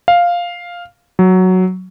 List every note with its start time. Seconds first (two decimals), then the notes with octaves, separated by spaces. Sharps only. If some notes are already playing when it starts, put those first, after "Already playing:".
0.08 F5
1.19 F#3